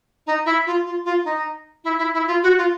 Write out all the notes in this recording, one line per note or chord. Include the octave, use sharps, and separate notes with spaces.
D#4
E4
F4
F4
F4
D#4
E4
E4
E4
F4
F#4
F4